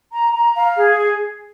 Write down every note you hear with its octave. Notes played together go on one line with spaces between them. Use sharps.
A#5
A#5
F5
G#4